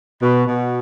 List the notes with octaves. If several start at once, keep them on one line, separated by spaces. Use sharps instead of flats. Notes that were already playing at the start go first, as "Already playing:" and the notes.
B2
B2